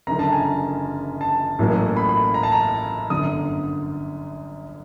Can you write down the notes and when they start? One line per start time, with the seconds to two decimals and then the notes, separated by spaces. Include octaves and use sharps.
0.07 F#1 F#2 D3 A#5
0.19 A5
0.32 G#5
1.21 A5
1.59 A1 A2 F#3 A#3 C#4
1.96 B5
2.09 B5
2.34 A#5
2.43 A5
2.52 A#5
3.10 G1 F#2 D3 D#6